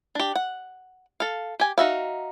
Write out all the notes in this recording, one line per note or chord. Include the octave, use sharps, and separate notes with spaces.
D4 G4
F#5
A4 F5
G4 G#5
D#4 F#4 E5 F5